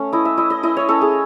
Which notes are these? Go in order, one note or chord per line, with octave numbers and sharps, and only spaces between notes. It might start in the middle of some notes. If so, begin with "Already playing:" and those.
Already playing: A3 C#4
E4 D#5
E5
E4 D#5
D#5
E4 D#5
C#5
C#4 A4
G#4